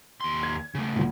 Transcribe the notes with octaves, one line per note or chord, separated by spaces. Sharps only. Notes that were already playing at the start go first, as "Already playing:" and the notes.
D#2 C6
G#6
C#3 A3
D2 A#2